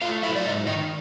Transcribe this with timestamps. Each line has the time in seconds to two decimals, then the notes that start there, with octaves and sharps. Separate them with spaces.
0.01 A3 F4 F5
0.23 F#3 E4 E5
0.35 D5
0.45 G#2 D#4 D#5
0.67 D#3 D#4 D#5